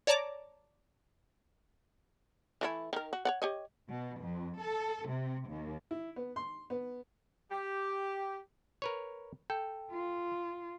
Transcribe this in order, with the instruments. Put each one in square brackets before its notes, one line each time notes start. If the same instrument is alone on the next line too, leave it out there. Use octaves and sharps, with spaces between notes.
[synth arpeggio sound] C#5 D5 A5 A#5 D6
[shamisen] E3 A3 E4
D#3 A#4
F#4
C#5 D5 F#5
G4 C#5 D#5
[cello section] B2
F2
A4
C3
D#2
[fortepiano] E4
B3
C6
B3
[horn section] G4
[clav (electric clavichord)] A#4 B4 C#5
[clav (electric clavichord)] A4 [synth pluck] G5
[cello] F4